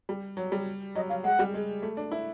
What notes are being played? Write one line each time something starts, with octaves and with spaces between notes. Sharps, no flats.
G3
F#3
G3
F#3 D#5
F#3 F5
G#3 F#5
G3
G#3
A3
D4
E4